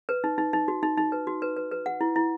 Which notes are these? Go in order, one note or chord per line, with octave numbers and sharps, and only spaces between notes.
B4
D#4
D#4
D#4
F#4
D#4
D#4
B4
F#4
B4
B4
B4
F#5
E4
E4